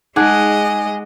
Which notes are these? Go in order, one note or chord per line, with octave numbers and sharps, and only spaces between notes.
G#3 D#4 G#4 D#5 F#5 D6